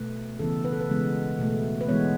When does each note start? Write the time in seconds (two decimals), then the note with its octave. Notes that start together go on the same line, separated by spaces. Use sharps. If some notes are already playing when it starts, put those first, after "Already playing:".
Already playing: B2 A3 B4
0.39 C#3 E3 B3 A4
0.65 B4
0.73 A4
0.81 B4
0.89 C#3 E3 G#3 B3
1.39 B2 A3
1.81 B4
1.88 E3 G#3 B3 C#5